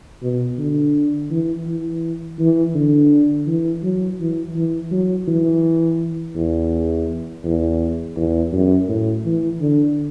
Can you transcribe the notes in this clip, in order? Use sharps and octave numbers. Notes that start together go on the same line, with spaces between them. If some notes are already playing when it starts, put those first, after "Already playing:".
B2
D3
E3
E3
E3
D3
E3
F#3
E3
E3
F#3
E3
E2
E2
E2
F#2
A2
E3
D3